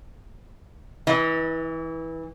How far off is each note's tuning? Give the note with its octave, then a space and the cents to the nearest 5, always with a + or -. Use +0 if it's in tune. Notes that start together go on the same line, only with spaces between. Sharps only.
E3 -20 D#5 +40